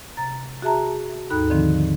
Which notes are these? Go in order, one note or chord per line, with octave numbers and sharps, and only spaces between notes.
C3 A#5 A6
F#4 G#4 E5 A5 A#5
D#2 G#2 D#4 A4 B5 F#6
D3 D#3 F3 C4